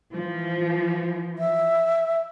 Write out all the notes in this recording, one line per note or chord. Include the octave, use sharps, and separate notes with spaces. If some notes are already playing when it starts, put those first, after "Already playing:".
E3 F3
E5